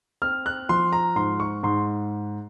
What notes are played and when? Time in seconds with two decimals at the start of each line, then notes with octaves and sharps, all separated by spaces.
0.22 C4 F6
0.46 F#6
0.69 F3 C6
0.93 A#5
1.16 G#2 C6
1.40 C#6
1.63 G#2 C6